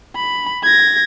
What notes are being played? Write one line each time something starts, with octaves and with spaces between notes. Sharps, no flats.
B5
G#6 A#6